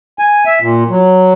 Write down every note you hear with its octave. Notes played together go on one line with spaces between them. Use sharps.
G#5
E5
A#2
F#3